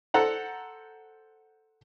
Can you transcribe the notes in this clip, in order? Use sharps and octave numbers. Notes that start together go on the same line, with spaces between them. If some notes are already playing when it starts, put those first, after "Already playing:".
A4 C5 F#5 A#5